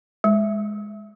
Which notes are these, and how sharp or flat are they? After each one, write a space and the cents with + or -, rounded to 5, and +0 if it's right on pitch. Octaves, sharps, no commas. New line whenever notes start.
G#3 +5